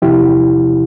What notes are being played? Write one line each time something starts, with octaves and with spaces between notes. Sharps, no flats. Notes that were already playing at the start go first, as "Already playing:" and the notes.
E2 C3 F3 E4 G4